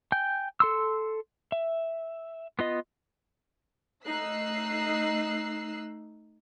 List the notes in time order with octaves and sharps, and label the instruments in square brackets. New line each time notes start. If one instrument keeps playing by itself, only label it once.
[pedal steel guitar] G5 G#5 G6
A4 C6 E6
E5
B3 F4 D#5
[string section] A3 D#4 E6 F#6 C7